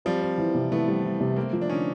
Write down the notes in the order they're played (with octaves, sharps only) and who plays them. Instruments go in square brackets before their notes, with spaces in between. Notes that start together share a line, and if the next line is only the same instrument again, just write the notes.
[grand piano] F3 G3 [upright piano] C4
[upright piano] C4
E3
C3
[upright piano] E3 [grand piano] A3 B3
[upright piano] G3
E3
C3
[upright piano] A3 [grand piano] A#3 C4
[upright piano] F3
[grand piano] D4
[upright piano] D3 [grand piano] C#4 D#4